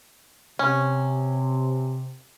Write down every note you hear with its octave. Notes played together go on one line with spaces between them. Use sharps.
C3 C#4